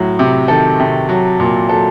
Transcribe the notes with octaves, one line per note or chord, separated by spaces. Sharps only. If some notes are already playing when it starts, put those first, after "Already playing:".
Already playing: A2 F#3
C3
D#3 A4
C3
F#3
A#2
F#3 A4